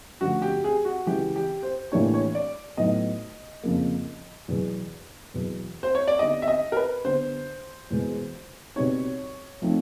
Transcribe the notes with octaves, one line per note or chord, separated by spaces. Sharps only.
G2 D3 F3 A3 C#4 F#4
G4
G#4
F#4
C#3 E3 G#3 G4
G4
C5
A2 E3 G3 A#3 D4 C#5
C#5
D5
A2 F#3 B3 D#4 D#5
F2 C#3 F3 A#3
E2 B2 F#3
E2 B2 F#3
C5
C#5
D5
D3 G3 B3 D#4 D#5
E5
D#5
A#4
B4
D3 G3 B3 D4 C5
E2 B2 G#3 B3
B2 G3 C4 D#4 C#5
F3 A3 C4 D#4